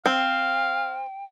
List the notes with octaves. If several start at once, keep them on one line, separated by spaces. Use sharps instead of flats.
C4 F5 G5